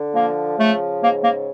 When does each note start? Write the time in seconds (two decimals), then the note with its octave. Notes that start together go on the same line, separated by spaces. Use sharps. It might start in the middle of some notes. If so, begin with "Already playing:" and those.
Already playing: D3
0.13 F3 A#3
0.57 C#3 A3
1.01 G#2 A#3
1.22 A#3